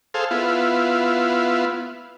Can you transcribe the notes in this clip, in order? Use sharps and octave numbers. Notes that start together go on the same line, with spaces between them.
G#4 A4 C5 F5
B3 E4 F4